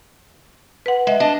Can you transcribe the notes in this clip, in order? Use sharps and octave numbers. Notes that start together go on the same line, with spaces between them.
B4 F#5
G#3 E5
D4 D#5 A5